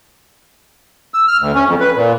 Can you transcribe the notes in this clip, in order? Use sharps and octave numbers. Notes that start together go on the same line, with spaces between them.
E6
F6
D2
C#4
F2
B4
A#2